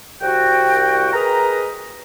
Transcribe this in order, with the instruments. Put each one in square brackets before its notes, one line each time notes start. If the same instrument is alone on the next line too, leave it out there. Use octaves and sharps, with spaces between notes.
[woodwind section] C2 F#4 G5
G#4 A#4 B4 D#5 A#5